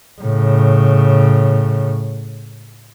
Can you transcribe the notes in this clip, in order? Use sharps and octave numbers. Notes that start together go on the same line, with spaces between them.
A2 C#3